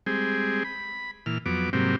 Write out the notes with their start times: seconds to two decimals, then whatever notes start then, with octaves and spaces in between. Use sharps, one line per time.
0.06 G3 G#3 C4 G#4
0.64 B5
1.26 A#2 E3 F6
1.46 F2 F#3 B3 D6
1.73 G#2 C3 F#3 G3 A#3 C4